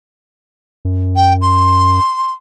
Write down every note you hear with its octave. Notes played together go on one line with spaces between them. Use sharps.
F#2
G5
C6